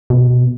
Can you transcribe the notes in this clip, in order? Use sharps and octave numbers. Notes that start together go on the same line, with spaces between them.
B2